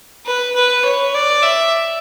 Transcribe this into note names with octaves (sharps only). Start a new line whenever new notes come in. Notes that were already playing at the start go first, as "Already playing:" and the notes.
B4
B4
C#5
D5
E5